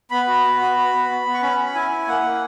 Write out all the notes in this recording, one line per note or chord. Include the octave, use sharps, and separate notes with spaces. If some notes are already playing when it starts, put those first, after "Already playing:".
B3 B5
F#4
B3
F#4
F#4
B3
B3
B3
C#6
C#4 B5
C#4
E4 G#5
E4
A#3 F#5
A#3